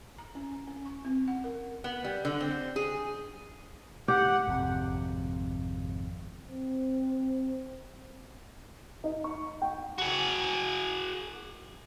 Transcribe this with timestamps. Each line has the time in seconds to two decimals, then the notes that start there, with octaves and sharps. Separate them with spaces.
0.18 A#5
0.35 C#4
0.67 C#4
0.85 C#6
1.05 C4
1.28 F#5
1.44 A#4
1.84 B3
2.04 G3
2.25 D3
2.41 C4
2.76 G#4
4.08 G4 F#5
4.47 G#1 F2 C3
6.46 C4
9.04 D#4
9.24 C#6
9.62 G5
9.98 F#4 G#4